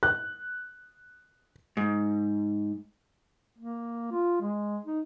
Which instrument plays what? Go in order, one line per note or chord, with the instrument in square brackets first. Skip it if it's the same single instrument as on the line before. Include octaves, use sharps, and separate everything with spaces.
[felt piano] F#6
[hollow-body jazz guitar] G#2
[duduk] A#3
F4
G#3
D#4